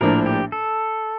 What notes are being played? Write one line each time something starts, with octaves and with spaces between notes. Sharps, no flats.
A#1 A2 F3 A#3 D4 A#4
G4
A4